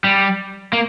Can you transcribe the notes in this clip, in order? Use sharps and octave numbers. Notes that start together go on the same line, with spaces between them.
G3
A#3